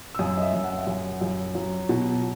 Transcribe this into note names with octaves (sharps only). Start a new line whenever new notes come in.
E6
F#2 D#6
D#5
E5
F#2
F#5
E5
F#2 F#5
F#2
F#3
B2